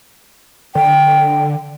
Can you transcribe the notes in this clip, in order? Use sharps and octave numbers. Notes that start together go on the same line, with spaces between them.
D3 G5